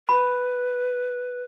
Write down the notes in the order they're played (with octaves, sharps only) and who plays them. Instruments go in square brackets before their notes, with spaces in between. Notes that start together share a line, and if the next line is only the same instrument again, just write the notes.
[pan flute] B4 [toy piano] B5